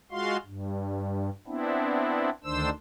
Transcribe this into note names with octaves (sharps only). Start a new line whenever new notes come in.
G#3 F4 F#4 F5 C6
G2
B3 C4 D4 E4
D2 D#3 D4 C5 E6